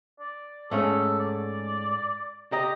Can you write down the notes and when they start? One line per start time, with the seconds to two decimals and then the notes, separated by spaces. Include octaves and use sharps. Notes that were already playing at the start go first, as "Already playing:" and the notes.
0.19 D5
0.71 G#2 A3 C#4 A4
1.19 D5
2.52 G4 D#5 A#5